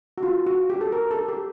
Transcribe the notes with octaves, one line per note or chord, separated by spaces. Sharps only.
F#4
F4
F#4
G4
A4
A#4
A4
G4